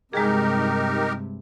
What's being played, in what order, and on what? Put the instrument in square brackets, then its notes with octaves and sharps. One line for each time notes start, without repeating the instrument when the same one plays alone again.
[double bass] G2 C3 [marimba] G#3 G#4 [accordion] D#4 G4 A#4